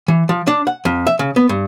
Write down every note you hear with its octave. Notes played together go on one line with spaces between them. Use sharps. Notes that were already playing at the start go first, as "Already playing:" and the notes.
E3
F3
D4
F#5
F2
E5
C#3
B3
G2